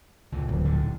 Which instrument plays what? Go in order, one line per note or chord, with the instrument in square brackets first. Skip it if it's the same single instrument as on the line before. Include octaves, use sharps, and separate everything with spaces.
[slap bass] C#2 A#2 E3
[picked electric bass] D1
[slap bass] A#1 G#2 D3